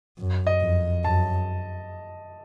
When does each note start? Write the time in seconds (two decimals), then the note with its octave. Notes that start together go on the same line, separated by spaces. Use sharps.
0.19 F#2
0.47 D#5
0.61 F2
1.04 F#2 A5